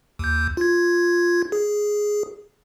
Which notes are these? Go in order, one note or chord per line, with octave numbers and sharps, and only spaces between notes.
D#2 G6
F4 G#6
G#4